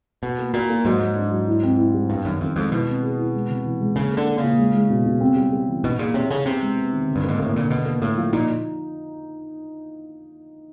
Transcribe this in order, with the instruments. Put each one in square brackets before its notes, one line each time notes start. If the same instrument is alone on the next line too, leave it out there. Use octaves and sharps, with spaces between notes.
[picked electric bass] B2 [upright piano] F#4
[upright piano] A#3
[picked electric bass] A#2 [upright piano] F#4
[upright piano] A#3
[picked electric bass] G#2 [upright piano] F#3
[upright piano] F#3
D4
F#3
E4
C4
E4
G3
[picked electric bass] G2 [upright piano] B3
[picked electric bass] F#2 [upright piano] D#3
[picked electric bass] F2 [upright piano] D#3
[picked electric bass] F2 [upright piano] G#3
[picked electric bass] B2 [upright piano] E4
[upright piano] C4
G#4
E4
G#3
C3
E3
G#3
[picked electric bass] C#3 [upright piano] A#3
[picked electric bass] D3 [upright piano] A#3
[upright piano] A#3
[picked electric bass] C#3
[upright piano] A#2
G#3
G#3
B2
B2
C4
G3
G3
E3
[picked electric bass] B2 [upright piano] D#4
[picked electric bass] A#2 [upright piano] G#4
[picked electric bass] C3 [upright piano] C#5
[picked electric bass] C#3 [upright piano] G#4
[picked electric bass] C3 [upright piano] B3
[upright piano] G#3
B3
D#3
D3
[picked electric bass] G2
[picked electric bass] G#2 [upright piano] A#3
[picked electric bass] A2 [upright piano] A#3
[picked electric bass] A#2 [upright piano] D3
[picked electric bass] B2 [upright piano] D4
[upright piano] A#3
[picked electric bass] A2 [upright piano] A#3
[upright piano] F3
[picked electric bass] A#2 [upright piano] D#4